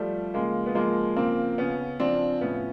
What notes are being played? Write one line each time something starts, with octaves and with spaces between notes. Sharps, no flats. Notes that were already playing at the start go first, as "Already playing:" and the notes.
Already playing: F3 G3 A3
C#3 G#3 A#3
B3
F3 G#3 A#3
C#3 A#3 C4
C#3 B3 C#4
F3 C4 D4
A2 B3 C#4